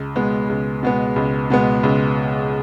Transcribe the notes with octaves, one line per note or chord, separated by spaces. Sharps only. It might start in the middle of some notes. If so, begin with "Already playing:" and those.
Already playing: C#2
B2 G#3 B3
C#2
B2 G#3 B3
C#2
B2 G#3 B3
C#2